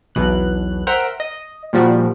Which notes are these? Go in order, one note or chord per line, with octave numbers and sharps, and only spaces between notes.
B1 E2 B2 F#6
A#4 C5 E5 F#5 G5 A#5
D#5
A#2 D#3 F3 G3 F#4